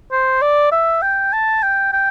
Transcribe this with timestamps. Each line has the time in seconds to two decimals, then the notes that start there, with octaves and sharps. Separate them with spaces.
0.12 C5
0.42 D5
0.72 E5
1.02 G5
1.33 A5
1.63 G5
1.93 G5